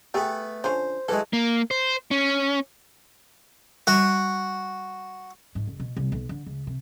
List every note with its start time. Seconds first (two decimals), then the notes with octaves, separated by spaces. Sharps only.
0.14 A3 B3 G4 G#4
0.64 D3 F3 C#4 C5
1.09 E3 F#3 G#3 A4
1.33 A#3
1.71 C5
2.11 C#4
3.87 G3 F#4
5.55 G#2
5.67 F#1
5.80 B2
5.97 C2
6.12 B1
6.29 D3
6.46 C#2
6.67 C3